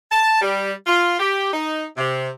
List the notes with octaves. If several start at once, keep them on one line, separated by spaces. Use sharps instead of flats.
A5
G3
F4
G4
D#4
C3